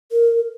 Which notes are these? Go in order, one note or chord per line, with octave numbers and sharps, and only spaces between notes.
A#4